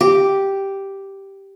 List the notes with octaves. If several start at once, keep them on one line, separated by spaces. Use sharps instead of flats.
G4